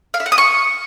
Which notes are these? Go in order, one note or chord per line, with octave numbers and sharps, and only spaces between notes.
F5
E5
F#5
D#6
C#6